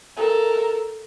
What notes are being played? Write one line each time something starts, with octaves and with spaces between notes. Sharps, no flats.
A4 A#4